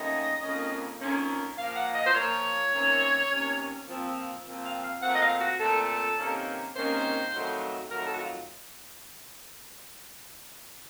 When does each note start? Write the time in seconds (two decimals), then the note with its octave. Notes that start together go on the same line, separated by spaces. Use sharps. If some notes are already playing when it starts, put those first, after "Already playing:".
Already playing: D#2 D#3 A3 C#4 D#5
0.42 F2 D#3 A#3 C#4
1.00 F2 D#3 A#3 C#4
1.57 A#2 F3 A#3 F5
1.76 F#5
1.95 D#5
2.06 C5
2.15 A#2 F3 A#3 C#5
2.72 C3 D#3 A#3 C#4
3.30 C3 D#3 A#3 C#4
3.87 A#2 F3 C4
4.45 A#2 F3 C4
4.64 F5
4.83 F5
5.02 A#2 A3 C4 F#5
5.13 D#5
5.22 F5
5.40 F#4
5.59 A#2 A3 C4 A4
6.17 C3 D#3 A#3 C#4
6.76 C3 D#3 A#3 C#4 C5
7.33 F2 D#3 F#3 A3
7.90 F2 D#3 F#3 A3 A#4
8.05 A4
8.13 F#4
8.18 F4